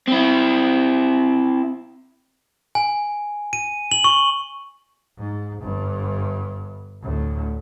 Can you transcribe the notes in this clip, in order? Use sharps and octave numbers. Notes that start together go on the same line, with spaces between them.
C4 E4
G#5
D#7
F#7
C#6
G#2
G1 G2
D2 A2